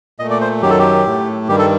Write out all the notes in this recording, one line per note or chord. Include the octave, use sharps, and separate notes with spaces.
A#2 A3 D#5
D5
C5
F#2 D#3 F#3 G4
A4
G4
A2 A3
G2 D#3 G3 G4
A4